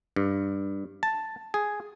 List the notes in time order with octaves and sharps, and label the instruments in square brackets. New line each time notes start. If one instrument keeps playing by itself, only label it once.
[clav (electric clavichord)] G2
A5
G#4